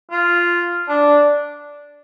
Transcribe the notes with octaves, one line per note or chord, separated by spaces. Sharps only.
F4
D4